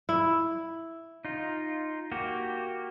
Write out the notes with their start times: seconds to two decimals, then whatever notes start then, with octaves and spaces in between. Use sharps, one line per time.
0.09 E4
1.25 D#4 F4
2.12 A#3 F#4 G4